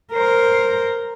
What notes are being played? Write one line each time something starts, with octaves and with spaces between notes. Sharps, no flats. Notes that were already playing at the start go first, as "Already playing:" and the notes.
A#4 C5